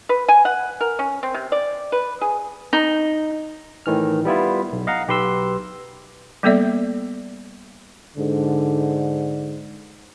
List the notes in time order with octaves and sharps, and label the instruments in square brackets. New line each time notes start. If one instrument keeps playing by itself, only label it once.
[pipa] B4
G#5
F#5
A#4
C#4
C4
C3
D5
B4
G#4
[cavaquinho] D#4
[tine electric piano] A2 D#3 E3 F6
G3 B3 E4 F4
B1
D#5 F5 F#5 A#5
B1 G4 B4 C6 E6
[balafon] G3 A#3 B3 A4 D5 E5
[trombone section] G#2 D3